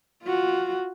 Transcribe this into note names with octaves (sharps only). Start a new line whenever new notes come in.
F4 F#4